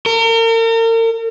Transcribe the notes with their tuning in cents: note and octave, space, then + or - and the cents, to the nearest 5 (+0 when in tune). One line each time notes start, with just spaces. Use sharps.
A#4 -40